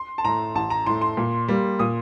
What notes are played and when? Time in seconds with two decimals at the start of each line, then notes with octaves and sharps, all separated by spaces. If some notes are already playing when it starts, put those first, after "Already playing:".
Already playing: C6
0.18 A5
0.24 A2 A3 A#5
0.55 A1 A5
0.70 A#5
0.86 A2 A3 C6
1.01 C6
1.17 A#2
1.48 G3 A#3
1.79 A#2 D#6